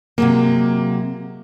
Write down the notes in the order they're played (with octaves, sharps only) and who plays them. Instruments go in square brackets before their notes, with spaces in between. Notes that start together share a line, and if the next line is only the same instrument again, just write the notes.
[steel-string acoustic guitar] C3 F#3 G#3 [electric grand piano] A#3